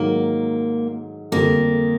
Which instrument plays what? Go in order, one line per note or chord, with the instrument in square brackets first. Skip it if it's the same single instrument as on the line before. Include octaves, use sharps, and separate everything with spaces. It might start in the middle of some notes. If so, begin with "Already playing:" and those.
Already playing: [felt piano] G#2 D#3 F#3 [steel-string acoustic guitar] A#3
[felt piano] F2 D3 G3 [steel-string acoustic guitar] A#3